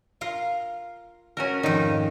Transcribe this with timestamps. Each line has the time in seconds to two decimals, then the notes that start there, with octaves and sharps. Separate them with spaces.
0.21 F4 A#4 F5
1.37 C#4 F#4 A#4
1.63 F2 G#2 D#3 D#4